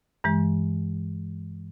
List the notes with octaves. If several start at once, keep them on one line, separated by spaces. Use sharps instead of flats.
G2 E3 G#3